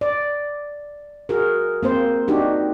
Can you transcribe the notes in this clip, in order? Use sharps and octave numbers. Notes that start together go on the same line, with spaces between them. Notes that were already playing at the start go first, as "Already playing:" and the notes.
D5
F#4 G#4 A#4
A#3 C4 C5
D4 D#4 F#4 G4